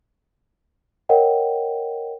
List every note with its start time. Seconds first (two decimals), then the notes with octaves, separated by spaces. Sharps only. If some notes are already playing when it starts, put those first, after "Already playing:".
1.09 A#4 C#5 D#5 F#5 G5